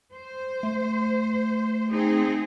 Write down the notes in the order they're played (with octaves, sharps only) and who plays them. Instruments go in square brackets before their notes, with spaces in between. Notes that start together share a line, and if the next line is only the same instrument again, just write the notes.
[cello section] C5
[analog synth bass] A3
[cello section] C4 D#4 G#4